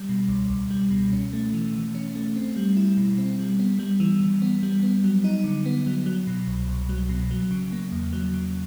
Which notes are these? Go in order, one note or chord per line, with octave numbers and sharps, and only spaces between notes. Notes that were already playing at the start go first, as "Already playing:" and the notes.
Already playing: G3
B2
C#2
C#2
G3
B2
C#4
A3
E3
E3
C#4
A3
C4
G3
E4
B2
C4
G3
B3
G3
E3
E3
B3
G3
B3
F#3
D#4
D3
B3
F#3
F#3
B2
C2
C2
F#3
B2
F#3
C#3
A#3
E2
F#3
C#3